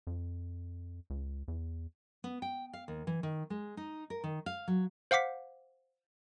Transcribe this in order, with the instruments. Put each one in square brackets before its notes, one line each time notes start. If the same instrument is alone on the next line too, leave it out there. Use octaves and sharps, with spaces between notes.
[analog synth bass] F2
C#2
E2
[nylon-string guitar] B3
G5
F5
D#2
E3
D#3
G#3
D#4
A#4
D#3
F5
F#3
[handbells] C5 F5 F#5 D6 B6